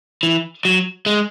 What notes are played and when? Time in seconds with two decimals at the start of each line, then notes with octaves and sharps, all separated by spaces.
0.23 E3
0.65 F#3
1.06 G#3